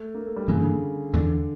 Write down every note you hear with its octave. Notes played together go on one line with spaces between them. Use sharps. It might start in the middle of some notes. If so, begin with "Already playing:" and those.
Already playing: A3
A#3
A3
G3
G2 C#3 E3 A#3
D3
C#3
E2 D3 E3 A3 D4